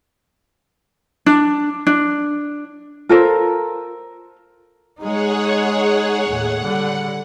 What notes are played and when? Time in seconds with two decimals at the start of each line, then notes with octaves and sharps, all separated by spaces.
1.26 D4
1.87 D4
3.09 F4 A4 A#4 C5
5.00 G#3 D#4 G#4 C#5 F#5
6.27 D#2 A2 F#5
6.63 D3 G3